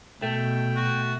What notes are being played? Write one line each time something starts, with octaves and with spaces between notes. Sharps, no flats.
B2 A3 G5
F#4